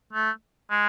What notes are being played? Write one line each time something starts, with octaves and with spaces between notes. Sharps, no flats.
A3
G#3